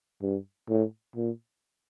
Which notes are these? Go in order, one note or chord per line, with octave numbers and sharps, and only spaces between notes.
G2
A2
A#2